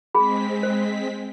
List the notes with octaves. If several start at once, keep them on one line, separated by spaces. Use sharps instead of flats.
G#3 C4 G#4 B5 B6
C5